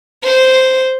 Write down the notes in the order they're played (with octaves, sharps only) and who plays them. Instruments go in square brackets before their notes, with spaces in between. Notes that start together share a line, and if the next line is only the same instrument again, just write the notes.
[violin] C5